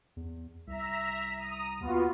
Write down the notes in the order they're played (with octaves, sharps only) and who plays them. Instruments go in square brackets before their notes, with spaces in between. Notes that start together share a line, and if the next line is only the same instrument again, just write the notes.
[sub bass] E2
[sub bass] C2 [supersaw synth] E5 A#5
[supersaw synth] A#5 D#6
[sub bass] D#2 [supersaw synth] B3 F4 F#4